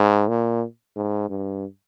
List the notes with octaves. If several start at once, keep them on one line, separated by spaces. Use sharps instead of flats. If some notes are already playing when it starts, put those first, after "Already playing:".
Already playing: G#2
A#2
G#2
G2